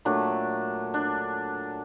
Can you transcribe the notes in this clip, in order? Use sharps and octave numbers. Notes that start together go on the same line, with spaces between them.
A#2 F#3 A3 D4
D4